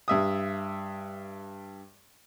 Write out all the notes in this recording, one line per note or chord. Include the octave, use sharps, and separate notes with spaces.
G2 E5 D#6